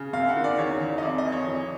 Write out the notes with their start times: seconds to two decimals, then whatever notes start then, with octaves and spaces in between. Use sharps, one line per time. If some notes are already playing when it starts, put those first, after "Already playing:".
Already playing: C#3
0.13 F#2 F5
0.29 F#5
0.36 D#3
0.44 D5
0.58 E2 C#5
0.81 E2
0.98 D#5
1.02 F2 D5
1.18 D#5
1.26 F2
1.32 C#5
1.48 E3